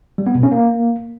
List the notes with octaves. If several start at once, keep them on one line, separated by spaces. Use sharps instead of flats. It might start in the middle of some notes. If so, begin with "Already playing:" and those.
G3
B3
B2
C#4
A#3